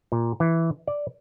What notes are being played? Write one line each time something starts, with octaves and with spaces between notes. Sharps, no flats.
A#2
E3
D5